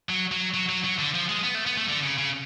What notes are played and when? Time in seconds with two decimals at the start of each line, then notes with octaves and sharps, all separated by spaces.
0.09 F#3
0.32 F#3
0.54 F#3
0.69 F#3
0.84 F#3
0.99 D3
1.14 F3
1.29 G#3
1.44 B3
1.55 A3
1.66 B3
1.77 A3
1.89 D3
2.03 C#3
2.18 C#3